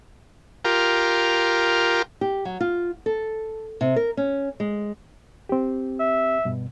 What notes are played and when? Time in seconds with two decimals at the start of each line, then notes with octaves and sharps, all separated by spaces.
0.65 F4 G4 A#4
2.21 G4
2.45 F#3
2.61 F4
3.06 A4
3.81 C3
3.96 A#4
4.17 C#4
4.60 G#3
5.49 C4 G4
6.00 E5
6.45 G2 B2